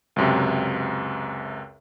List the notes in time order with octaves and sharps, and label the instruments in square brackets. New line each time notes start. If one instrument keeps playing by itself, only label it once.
[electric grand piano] C#2 F#2 C3